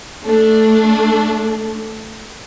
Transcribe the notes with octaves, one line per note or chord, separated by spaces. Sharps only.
A3 D4